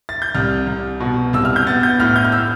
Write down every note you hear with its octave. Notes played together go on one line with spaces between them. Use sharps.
A6
G6
C2 F6
C2
B2
C2 E6
F6
G6
B3 A6
G6
A2 F6
G6
F6
E6